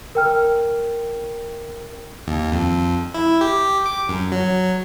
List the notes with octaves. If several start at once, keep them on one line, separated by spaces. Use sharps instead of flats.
A#4 G5 F6
D#2
F2
E4
G4
D6
F#2
F#3